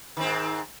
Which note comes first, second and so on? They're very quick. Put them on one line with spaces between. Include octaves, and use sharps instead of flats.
D#3 C4 G#2